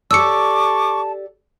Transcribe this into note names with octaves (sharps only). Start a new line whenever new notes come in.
G4 A4 D5 A5 C#6 D6 E6 C#7